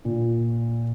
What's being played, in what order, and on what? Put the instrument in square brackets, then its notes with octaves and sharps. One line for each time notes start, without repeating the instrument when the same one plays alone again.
[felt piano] A#2